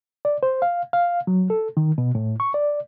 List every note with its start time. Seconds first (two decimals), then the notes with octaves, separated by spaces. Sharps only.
0.25 D5
0.43 C5
0.62 F5
0.93 F5
1.27 F#3
1.50 A4
1.77 D#3
1.98 B2
2.15 A2
2.40 C#6
2.54 D5